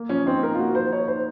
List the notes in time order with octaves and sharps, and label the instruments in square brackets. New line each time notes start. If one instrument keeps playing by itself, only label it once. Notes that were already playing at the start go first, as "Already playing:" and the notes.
Already playing: [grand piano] A#3
[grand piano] F3 [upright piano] C#4
[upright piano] C4 [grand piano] D#4
[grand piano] A#3 [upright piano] A#4
[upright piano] F4
[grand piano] A#3 [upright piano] F#4
[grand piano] F3 [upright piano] C5
[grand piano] D#4 [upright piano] C#5
[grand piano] D#4 [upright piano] C5